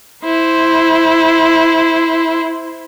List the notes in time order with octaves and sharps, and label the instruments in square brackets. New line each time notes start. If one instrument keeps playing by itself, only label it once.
[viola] E4 C5